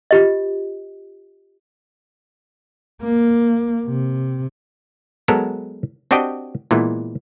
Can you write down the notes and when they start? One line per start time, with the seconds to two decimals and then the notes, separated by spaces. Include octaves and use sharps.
0.11 F4 G4 D#5
3.02 A#3
3.86 C3
5.28 F#3 G#3 B3 A4 A#4
6.11 C4 D4 F#4 G4 D#5 G5
6.71 A#2 E3 G#3 B3